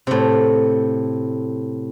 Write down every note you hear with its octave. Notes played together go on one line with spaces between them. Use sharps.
A2 C3